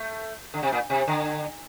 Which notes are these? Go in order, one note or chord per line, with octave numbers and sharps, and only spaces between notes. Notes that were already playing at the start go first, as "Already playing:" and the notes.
Already playing: A3
D3
C3
A#2
C3
D3